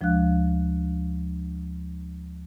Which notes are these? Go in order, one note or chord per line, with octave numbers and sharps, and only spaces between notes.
D2 F3 G#3 D4 F5 F#6